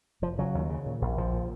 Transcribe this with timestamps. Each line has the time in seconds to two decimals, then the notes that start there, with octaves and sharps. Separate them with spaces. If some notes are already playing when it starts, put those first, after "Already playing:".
0.22 F1 F3
0.38 C#3 F#3
0.55 D#2
0.70 C#3
0.86 A#2
1.01 A#1
1.17 A#1 F3
1.33 A#2